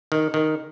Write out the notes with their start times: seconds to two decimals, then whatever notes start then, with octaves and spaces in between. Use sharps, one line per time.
0.12 D#3
0.34 D#3